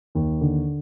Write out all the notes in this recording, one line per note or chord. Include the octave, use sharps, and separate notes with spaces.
D#2
D3